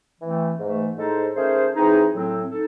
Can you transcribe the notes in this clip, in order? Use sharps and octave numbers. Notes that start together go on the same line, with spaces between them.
E3 A3 C4
G#2 E3 A3
A2 G#3 D#4 A4 C5
D#3 A3 C#4 G#4 C5
E3 C4 D#4 G#4
A2 F#3 C4
D#4 A4